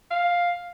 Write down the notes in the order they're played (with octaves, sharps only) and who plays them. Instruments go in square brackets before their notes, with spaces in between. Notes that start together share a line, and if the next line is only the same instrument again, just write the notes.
[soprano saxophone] F5